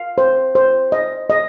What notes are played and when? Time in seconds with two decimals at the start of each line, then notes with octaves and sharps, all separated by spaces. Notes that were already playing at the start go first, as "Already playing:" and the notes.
Already playing: F5
0.18 C5
0.55 C5
0.92 D#5
1.30 D#5